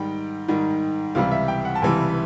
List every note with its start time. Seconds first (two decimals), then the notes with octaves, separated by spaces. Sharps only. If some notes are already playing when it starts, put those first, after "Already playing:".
Already playing: G#2 D#3 G3 G5
0.48 G#2 D#3 G3
1.15 C#2 C3 E3 G3 F5
1.31 E5
1.48 G5
1.65 F#5
1.75 A5
1.82 C#2 C3 E3 G3 G#5